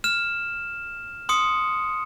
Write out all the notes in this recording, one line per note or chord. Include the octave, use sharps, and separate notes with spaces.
F6 E7
C6 D#6 C#7